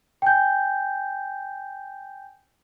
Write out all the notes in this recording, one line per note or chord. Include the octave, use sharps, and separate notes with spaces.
G5 G#5 G6